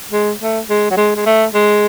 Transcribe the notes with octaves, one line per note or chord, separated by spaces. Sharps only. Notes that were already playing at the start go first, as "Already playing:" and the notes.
G#3
A3
G#3
F#3
G#3
G#3
A3
G#3